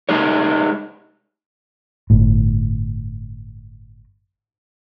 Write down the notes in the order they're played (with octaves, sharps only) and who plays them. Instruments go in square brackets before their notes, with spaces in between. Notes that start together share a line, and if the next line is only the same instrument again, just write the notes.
[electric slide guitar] G#3 D#4 G4 C#5
[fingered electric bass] G1 A2